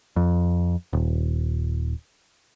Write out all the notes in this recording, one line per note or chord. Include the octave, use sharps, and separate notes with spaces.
F2
D#1